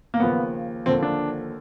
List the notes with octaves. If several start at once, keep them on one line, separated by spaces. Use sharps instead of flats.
A#3
D#2 C#3 F3 B3
D#2 D3 F3 C4
D4